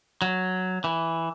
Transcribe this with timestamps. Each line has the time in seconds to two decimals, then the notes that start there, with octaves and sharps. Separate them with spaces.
0.22 F#3
0.84 E3